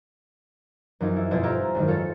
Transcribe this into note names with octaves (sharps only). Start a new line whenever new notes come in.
F#2 E3 F3 C4 D#4
E4
G1 F2 B2 A4 C5 G#5
F4 G4 E5 G#5 A#5 D6
G#1 F#2 D#3
F4 A4 C5 C#5